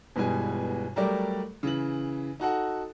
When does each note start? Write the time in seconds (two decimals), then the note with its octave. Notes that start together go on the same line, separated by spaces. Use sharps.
0.16 G1 B2 E3 G3 G#3 G#5
0.96 F#3 G3 A3 G4 A#4 D5
1.63 C#3 E3 F#7
2.40 D#4 F#4 A4 F#5